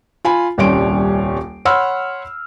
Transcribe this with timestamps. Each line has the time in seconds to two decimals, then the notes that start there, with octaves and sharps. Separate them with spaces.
0.25 F4 G#5 B5
0.58 D#1 C2 G3 C#4 C6 D7
1.65 C#5 F#5 B5 C6 E6 F6